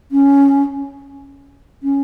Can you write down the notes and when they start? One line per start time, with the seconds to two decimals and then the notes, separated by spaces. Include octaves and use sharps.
0.11 C#4
1.83 C#4